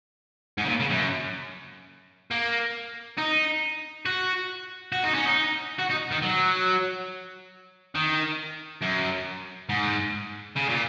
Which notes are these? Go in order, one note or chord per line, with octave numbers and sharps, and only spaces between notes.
G#2
C#3
A#2
C#3
F#2
A#3
D#4
F#4
F#4
D#4
C#4
D#4
F#4
D#4
D#3
F#3
D#3
F#2
G#2
C#3
A#2